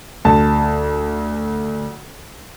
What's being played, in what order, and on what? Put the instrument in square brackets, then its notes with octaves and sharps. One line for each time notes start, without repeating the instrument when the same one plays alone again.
[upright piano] D2 A5